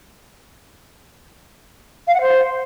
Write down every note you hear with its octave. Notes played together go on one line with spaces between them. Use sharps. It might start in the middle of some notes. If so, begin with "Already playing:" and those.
F5
F#5
C5